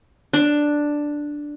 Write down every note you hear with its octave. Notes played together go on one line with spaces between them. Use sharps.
D4